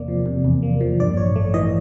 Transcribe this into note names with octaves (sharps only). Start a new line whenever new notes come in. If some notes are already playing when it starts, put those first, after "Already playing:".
Already playing: E2 C3 A#3 D5
F3
C3
E2
A#3
F3
G2 D5
A1 C#5
A3
E3 D#5